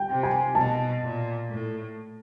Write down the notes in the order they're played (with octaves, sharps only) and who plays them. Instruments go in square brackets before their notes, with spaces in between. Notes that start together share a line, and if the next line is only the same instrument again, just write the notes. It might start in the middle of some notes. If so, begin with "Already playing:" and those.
Already playing: [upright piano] G5
[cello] C3
[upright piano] G#5
[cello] B2 [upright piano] A5
[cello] A#2
A2